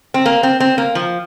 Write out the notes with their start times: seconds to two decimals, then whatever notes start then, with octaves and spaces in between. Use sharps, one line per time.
0.14 C4
0.26 A#3
0.43 C4
0.60 C4
0.78 A#3
0.95 F3